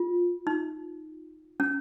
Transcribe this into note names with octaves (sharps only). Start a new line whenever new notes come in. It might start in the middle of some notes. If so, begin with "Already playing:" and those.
Already playing: F4
D#4
C#4